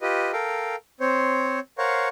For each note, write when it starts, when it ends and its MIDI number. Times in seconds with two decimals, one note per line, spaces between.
0.01 0.32 65
0.01 0.32 67
0.01 0.32 71
0.01 0.32 75
0.33 0.76 69
0.33 0.76 70
0.33 0.76 77
0.33 0.76 79
1.01 1.59 60
1.01 1.59 72
1.01 1.59 73
1.78 2.09 70
1.78 2.09 72
1.78 2.09 73
1.78 2.09 77
1.78 2.09 78
1.78 2.09 85